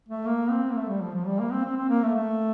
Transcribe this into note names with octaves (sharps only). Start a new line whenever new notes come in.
A3
A#3
C4
A#3
A3
G3
F3
F3
G3
A#3
C4
C4
C4
A#3
A3
A3